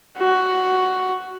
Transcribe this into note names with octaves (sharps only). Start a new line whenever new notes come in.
F#4